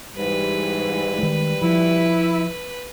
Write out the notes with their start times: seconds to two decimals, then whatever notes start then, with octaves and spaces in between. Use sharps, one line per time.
0.17 G#2 E3 G3 B4
1.19 D#3 G#3
1.62 F3 E4